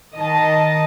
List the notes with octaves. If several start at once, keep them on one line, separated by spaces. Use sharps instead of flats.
D#3 D#5 A5